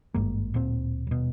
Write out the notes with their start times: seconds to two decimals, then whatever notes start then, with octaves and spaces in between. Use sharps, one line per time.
0.14 G#1 G2 G#3 A#3
0.54 D1 A#2 C4
1.07 D#1 B2